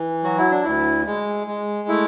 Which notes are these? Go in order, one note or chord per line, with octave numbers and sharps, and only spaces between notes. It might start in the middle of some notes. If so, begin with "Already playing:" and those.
Already playing: E3
F#3 F#4
E4
D4
D2 E4
G#3
G#3
A3 E4